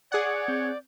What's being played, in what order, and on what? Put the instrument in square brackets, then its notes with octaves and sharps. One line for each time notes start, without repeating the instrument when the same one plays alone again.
[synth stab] G#4 F#5 [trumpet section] C#5 [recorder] D5
[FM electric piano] C4 G6